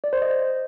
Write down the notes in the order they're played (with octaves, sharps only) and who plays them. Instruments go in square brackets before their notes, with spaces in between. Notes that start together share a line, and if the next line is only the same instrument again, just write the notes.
[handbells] D5
C5
D#5